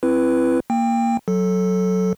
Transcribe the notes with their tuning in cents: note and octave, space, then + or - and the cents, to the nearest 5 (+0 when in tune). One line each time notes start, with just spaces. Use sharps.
C4 +0 E4 +25 B4 +0
A#3 +0 G5 +20
F#3 +0 A4 +0